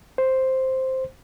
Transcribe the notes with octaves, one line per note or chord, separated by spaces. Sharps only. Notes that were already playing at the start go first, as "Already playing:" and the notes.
C5